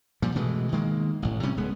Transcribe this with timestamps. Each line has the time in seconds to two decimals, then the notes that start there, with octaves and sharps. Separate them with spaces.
0.22 A#2 F3 G3
0.35 B2 E3 G#3 A3
0.72 D#3 G#3 A#3
1.22 A1 A2
1.43 C3 G3 C#4
1.57 D1 G#3 B3